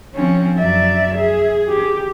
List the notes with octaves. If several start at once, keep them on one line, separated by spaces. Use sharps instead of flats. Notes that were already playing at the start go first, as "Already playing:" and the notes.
F3 C4 C#4
F#2 D5 E5
G#4
G4